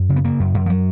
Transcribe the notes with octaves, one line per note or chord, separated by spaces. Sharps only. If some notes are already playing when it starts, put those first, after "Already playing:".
Already playing: F#2
C#3
B3
C#3 A#3
F#2
F#2
F3
F#3